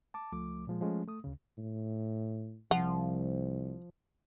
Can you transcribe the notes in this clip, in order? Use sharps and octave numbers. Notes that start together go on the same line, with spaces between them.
A5 D6
C#2 F3 A3 D6
A#2 F3 G#3
F3 G#3 A3 C#4
A3 D#6
D2 C#3
A2
C2 F3 F#5